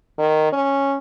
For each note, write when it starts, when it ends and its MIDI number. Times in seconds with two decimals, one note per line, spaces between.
0.19 0.51 51
0.53 0.97 61